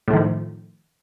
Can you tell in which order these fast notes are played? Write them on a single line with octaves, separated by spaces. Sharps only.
A2 A3 D#3 F3